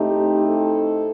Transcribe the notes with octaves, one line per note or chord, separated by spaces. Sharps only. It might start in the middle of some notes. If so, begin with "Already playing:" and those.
Already playing: A2 A3 C4 D#4 G4
A4